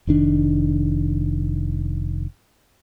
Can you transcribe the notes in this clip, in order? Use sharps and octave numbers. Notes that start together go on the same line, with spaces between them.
F1 D#3 D4